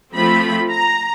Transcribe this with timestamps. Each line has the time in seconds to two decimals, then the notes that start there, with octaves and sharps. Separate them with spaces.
0.15 F3 A3 C4 F4 B5
0.72 A#5